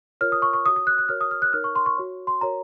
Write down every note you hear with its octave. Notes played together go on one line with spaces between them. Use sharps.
F4 A#4 C#5 F6
D#6
C#6
C#6
F#4 C#5 D#6
D#6
F#6
F#6
F#4 A#4 C#5 F6
D#6
F6
F#6
D#4 A#4 C#5 F6
C#6
C6
C#6
F#4 C#5
C6
F#4 A#4 C#5 A#5